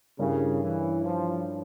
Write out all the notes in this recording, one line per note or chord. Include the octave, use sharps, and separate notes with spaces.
G2 C#3 G3 C#4 E4 A#4
E3
F3